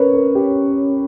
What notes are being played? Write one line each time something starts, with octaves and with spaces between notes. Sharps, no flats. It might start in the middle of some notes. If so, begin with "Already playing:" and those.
Already playing: C#4 A#4 B4 C#5
A#4
G4